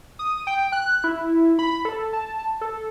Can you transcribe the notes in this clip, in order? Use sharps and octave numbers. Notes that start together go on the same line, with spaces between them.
D#6
G5
F#6
E4
B5
A4
A5
A4